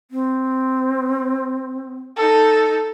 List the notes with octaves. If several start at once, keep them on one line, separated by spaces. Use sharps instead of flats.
C4
D#4 A4